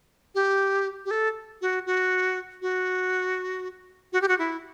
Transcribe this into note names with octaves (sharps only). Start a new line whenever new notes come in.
G4
G4
A4
F#4
F#4
F#4
F#4
G4
F#4
E4